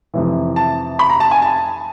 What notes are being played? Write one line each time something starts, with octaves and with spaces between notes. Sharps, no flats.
F2 C3 E3
A5
B5
A#5
A5
G#5
A5